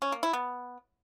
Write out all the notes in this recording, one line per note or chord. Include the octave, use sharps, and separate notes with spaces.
C#4
A#3
E4
B3